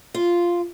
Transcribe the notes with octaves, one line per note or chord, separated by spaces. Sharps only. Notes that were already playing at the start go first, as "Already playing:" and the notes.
F4